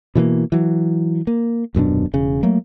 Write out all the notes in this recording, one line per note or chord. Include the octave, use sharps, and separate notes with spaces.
B2 E3 F3 A#3
E3 F#3
A#3
D#1 F#2 B2 D4
E1 C#3
F#3 A3 A#3